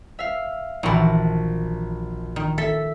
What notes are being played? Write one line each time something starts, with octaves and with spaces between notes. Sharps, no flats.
E5 F5
A#1 D#3 E3 F#4 A5
D#3
A4 E5 B6